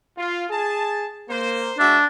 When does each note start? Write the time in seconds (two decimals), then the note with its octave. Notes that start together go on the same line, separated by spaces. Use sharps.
0.17 F4
0.51 G#4 A5
1.29 A#3 C5
1.79 G#3 D4 F#4 E5